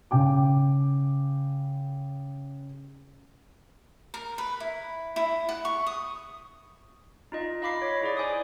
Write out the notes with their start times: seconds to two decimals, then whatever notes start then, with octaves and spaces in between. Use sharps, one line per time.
0.11 C#3 G5 D6
4.14 A#4
4.38 B4
4.60 E4
5.16 E4
5.49 F#5
5.65 C#6
5.86 D#6
7.32 D#4 F4 D#5
7.62 D#5 F5 B5 D6 B6 C7
7.82 C#5 D6
8.01 E4 G#4 D5
8.17 C5 G#5 D6 D#6